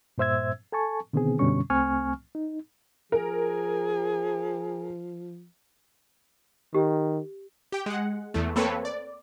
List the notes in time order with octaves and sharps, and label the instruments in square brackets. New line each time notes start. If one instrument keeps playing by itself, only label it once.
[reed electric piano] G2 A#2 C5 E5 E6 G#6
A4 G#5 A5 C#6
B2 D3 D#3 B3 C4 G#4
F#2 B2 D3 G3 C#4 C#6
C2 A3 C4 G#5 C#6 F6
D#4
[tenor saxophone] F3 [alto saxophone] G#4 [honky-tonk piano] A#4
[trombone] D#3 [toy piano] G4
[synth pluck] G4 G5
G#3 F#5
E2 A3
A#3 C4 A4 B4 C#5
D5